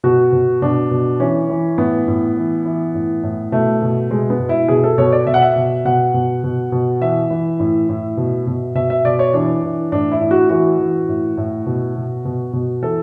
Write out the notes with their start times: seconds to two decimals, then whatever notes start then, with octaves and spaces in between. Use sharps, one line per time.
0.04 B2 F#4
0.32 B2
0.62 B2 D4
0.91 B2
1.20 E3 C#4
1.50 E3
1.78 A2 B3
2.07 A2
2.37 E3
2.65 E3
2.95 A2
3.23 A2
3.52 B2 A3
3.82 B2
4.10 B2 G#3
4.30 B3
4.39 B2
4.49 E4
4.68 B2 G#4
4.84 A4
4.98 B2 C#5
5.12 D5
5.26 B2 E5
5.34 F#5
5.42 E5
5.56 B2
5.85 B2 F#5
6.14 B2
6.44 B2
6.72 B2
7.01 E3 E5
7.30 E3
7.60 A2
7.89 A2
8.17 B2
8.47 B2
8.75 B2 E5
8.90 E5
9.04 B2 D5
9.19 C#5
9.34 E3 D4
9.63 E3
9.92 A2 D4
10.12 E4
10.20 A2
10.31 F#4
10.50 E3 F#4
10.79 E3
11.08 A2
11.37 A2
11.66 B2
11.95 B2
12.25 B2
12.53 B2
12.82 E3 A4